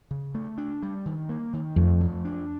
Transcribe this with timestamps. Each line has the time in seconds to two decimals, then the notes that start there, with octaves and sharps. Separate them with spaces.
0.11 C#3
0.34 A3
0.58 D4
0.83 G3
1.06 D#3
1.29 A#3
1.53 D#3
1.76 F2 A3
2.01 F3
2.25 D4